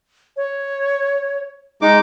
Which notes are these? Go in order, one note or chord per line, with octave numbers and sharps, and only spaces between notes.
C#5
G#3 D#4 D#5 D6